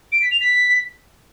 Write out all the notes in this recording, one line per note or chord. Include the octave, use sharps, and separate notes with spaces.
D7
B6
F7
B6